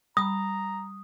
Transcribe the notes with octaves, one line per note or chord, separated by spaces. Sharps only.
G3 A#5 B5 D#6